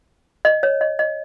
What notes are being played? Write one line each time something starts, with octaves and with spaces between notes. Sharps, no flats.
D#5
C#5
D#5
D#5